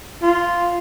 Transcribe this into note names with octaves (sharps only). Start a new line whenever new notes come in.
F4